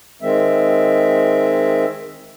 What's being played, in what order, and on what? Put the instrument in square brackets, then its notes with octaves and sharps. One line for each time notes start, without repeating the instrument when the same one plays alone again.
[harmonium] D#3 G#3 C4 E5